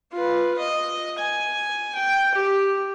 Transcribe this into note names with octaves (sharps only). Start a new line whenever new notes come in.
F4 B4
D#5
G#5
G5
G4